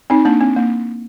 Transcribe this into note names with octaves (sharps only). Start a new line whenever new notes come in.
C4 D#4
A#3 D4
C4
A#3